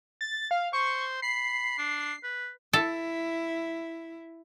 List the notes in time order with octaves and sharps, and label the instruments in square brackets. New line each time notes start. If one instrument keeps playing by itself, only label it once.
[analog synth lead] A6
F5
[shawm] C5 [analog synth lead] C#6
[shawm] B5 [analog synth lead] C7
[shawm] D4
B4
[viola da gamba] E4 [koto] A4